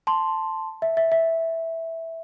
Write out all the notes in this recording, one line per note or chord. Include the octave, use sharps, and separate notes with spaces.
A5 C6
E5
E5
E5